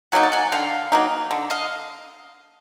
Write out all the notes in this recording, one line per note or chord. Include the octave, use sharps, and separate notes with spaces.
F#3 A#3 D#4 F#5 G#5
A5
F#5 G#5
D3 F5 G5
F#3 A#3 D#4
D3
D#5 F5